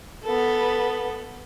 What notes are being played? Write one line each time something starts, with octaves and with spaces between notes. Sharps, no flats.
B3 A4